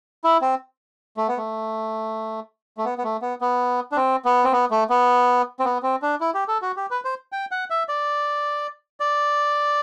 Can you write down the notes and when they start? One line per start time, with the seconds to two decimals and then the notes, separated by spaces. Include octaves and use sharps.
0.24 E4
0.42 C4
1.17 A3
1.28 B3
1.37 A3
2.77 A3
2.85 B3
2.98 B3
3.04 A3
3.22 B3
3.41 B3
3.92 D4
3.96 C4
4.25 B3
4.44 C4
4.52 B3
4.71 A3
4.90 B3
5.60 C4
5.65 B3
5.83 C4
6.02 D4
6.21 E4
6.34 G4
6.48 A4
6.62 F#4
6.76 G4
6.91 B4
7.05 C5
7.32 G5
7.51 F#5
7.70 E5
7.89 D5
9.00 D5